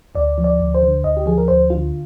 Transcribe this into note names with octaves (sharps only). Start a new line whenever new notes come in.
D2 D5
F3
D5
D2
C5
D3
D2 D#5
G4
F3 G#4
A#4
D2 C5
D3 F4